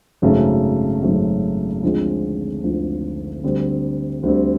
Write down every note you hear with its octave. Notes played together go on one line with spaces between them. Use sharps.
G#1 F#2 C#3 F#3 A3
G#1 F#2 C#3 F#3 A3
D2 D3 F3 G#3 C4
D2 D3 F3 G#3 C4
D2 D3 G3 C4
D2 D3 G3 C4